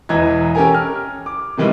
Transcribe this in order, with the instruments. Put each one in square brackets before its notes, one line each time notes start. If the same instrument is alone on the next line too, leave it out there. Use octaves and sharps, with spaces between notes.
[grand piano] E1 E2 E3 D#5 A#5 G#6
C#4 G4 A4 A#4 G#5 A#5
F6
D6
C3 D#3 E3 G3 G#3